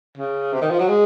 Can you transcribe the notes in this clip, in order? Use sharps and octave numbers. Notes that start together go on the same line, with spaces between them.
C#3
C3
D#3
F3
F#3
G#3